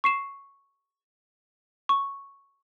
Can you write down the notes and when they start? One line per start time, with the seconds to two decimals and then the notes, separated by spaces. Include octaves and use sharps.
0.04 C#6 C7 E7
1.89 C#6